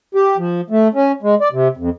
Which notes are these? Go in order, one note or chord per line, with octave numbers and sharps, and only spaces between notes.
G4
F3
A3
C#4
G#3
D5
C3
F2